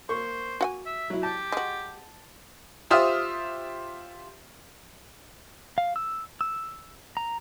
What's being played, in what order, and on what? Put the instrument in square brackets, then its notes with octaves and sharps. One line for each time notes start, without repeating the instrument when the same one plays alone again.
[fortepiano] A#3 C#6 [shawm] C5
[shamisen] F#4 F#5 G#5
[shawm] E5
[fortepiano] F#3 E4
[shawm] G4 [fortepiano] A5
[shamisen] G#3 F#4
[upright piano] F4 G4 C5 E5 D#6 F6
[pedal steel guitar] F5
E6
E6
A#5